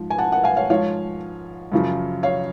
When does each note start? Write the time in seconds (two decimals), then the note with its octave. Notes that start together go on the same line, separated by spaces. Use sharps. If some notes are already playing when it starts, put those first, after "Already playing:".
Already playing: G#2 F3
0.10 G#5
0.18 F#5 A5
0.32 F#5
0.44 F5 G#5
0.56 C#5 F5
0.70 G#2 F3 C#5 F5
1.72 F#2 C#3 F3
2.23 C#5 F5